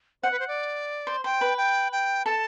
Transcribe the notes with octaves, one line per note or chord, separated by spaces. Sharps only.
C5 F#5
B4
C5
D5
C5
C5 G5
B4
G5
G5
A4 A5